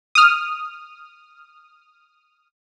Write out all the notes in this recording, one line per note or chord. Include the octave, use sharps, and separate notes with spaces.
D#6 F6